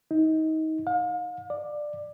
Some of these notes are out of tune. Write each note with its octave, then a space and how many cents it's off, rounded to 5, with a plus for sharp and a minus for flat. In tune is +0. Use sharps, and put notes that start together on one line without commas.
D#4 +25
F5 +40
D5 +15